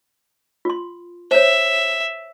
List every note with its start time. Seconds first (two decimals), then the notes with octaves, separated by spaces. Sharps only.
0.65 F4 C6
1.31 C5 C#5 E5